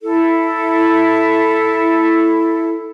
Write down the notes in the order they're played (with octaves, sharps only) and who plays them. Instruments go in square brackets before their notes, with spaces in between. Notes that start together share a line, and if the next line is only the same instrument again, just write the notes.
[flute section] E4 A4